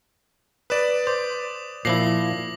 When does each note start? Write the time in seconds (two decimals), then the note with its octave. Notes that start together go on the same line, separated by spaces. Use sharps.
0.70 B4 D5 D#6 E7
1.07 C5 D6
1.85 A#2 F3 E4 D6 A#6 C7 F#7